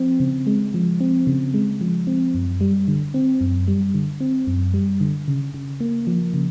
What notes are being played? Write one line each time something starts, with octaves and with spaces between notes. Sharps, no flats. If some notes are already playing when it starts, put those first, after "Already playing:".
Already playing: F3 C4
C#3
G#3
F3
C4
C#3
G#3
F3
C4
F#2
G3
D3
C4
F#2
G3
D3
C4
F#2
G3
D3
C#3
C#3
A#3
F3
C#3